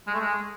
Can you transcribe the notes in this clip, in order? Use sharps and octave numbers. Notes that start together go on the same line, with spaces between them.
G#3
A3
G#3